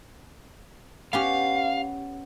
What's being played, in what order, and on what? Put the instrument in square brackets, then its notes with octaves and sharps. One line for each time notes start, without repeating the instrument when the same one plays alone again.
[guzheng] B3 C#4 G4 [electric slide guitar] F5